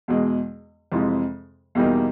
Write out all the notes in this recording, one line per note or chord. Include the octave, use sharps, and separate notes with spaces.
E2 B2 G#3
F2 C3 E3 G#3
E2 B2 G3 A#3 D#4